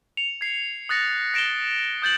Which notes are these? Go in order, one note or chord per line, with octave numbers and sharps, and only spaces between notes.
C#7 F7
G#6 C7
D#6 F#6 A6 A#6 C#7
A#6 D7 E7 F7 G7
D#6 G6 A6 F#7